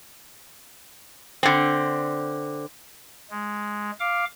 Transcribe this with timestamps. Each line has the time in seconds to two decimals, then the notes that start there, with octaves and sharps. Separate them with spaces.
1.43 D3 C4
3.30 G#3
4.00 F5 D6